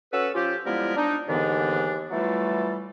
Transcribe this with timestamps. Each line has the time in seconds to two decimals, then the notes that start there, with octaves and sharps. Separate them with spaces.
0.12 C#4 F#4 A4 B4 E6
0.35 F3 C#4 F4 G4
0.66 F3 G3 G#3 B3 E4 A#4
0.96 D4 D#4
1.29 D#2 G#2 D3 E3 B3 D4
2.11 E3 F#3 G3 A3 F4 A4